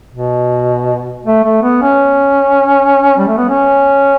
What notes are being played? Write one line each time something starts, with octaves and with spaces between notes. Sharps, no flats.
B2
A3
A3
B3
C#4
G3
A3
B3
C#4